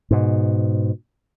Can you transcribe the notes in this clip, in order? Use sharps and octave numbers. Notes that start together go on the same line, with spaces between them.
G#2 B2